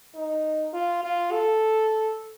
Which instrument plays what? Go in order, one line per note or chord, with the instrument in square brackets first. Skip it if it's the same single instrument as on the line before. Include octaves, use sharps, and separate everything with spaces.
[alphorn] D#4
F4
F4
A4